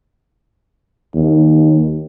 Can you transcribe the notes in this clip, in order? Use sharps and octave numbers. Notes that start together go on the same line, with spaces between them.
D#2